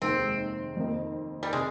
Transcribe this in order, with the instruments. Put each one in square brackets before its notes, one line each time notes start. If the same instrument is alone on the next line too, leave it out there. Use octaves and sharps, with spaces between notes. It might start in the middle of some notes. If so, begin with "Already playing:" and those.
[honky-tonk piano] F1 D#2 D#3 G#3 [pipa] C4
[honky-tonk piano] F2 D#3 A#3 D#4
[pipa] G3
[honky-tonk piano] C3 [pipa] G#3